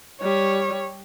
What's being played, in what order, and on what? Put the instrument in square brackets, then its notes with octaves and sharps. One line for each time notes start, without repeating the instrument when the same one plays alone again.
[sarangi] G3 [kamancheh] C#5